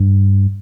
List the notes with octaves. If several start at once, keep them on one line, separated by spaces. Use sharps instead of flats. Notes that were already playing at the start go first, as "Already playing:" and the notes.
Already playing: G2